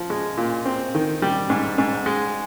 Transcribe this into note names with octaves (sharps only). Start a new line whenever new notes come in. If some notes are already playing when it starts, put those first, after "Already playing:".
Already playing: F3
G#3
A#2
C4
D#3
G3
G#2
G#2
G#3